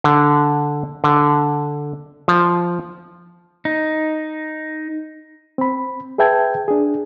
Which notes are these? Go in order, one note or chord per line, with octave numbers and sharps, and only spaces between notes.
D3
D3
F3
D#4
C4 B5
G#4 B4 E5 G5 A5 G#6
D4 G#4